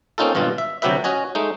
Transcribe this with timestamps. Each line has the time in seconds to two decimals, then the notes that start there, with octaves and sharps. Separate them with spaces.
0.18 A#3 C4 C#4 D#4 F4 A4
0.35 G#1 G2 B2 F4
0.58 E5
0.82 D2 C3 F#3 G4 B4 E5
1.04 C#4 F#4 D#5 G#5
1.35 G#3 A3 D#4